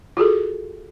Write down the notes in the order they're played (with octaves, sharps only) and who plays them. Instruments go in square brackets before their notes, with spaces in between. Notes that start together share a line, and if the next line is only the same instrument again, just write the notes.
[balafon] F4 F#4 G#4 A4